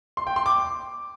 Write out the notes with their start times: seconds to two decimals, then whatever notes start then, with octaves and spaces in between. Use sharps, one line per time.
0.17 C6
0.27 G5
0.36 C6
0.46 D6